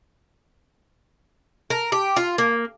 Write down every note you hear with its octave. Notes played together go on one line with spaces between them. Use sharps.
A#4
G4
F4
A#3